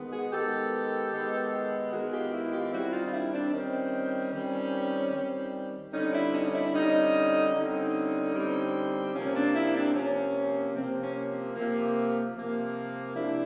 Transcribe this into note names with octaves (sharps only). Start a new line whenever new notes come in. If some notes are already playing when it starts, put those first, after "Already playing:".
Already playing: D#3 G#3 B3
F#4 G#4
D#3 G#3 B3 G4 A4
D#3 G#3 B3
D#3 G#3 B3 F#4 G#4
F4 G4
E4 F#4
F4 G4
D#3 G3 C4 E4 F#4
D#4 F4
D#4
D4 E4
C4 D4
D#3 G3 C4 C#4
D#3 G3 C4
D#3 G3 C4
D3 G3 C4 C#4 D#4
D4 E4
C#4 D#4
D4 E4
D3 G3 C4 C#4 D#4
D3 G3 C4 C#4 D#4
D3 G3 C4
C3 F3 A#3 C#4
C4 D4
D4 E4
C4 D4
C3 F3 A#3 C#4
C3 F3 A#3 C4
C#4
C3 F3 A#3
C3 F3 A#3
C3 F3 A#3 D4 E4